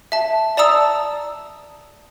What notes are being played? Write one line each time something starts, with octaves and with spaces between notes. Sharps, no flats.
E5 A5
D5 A5 A#5 D#6 E6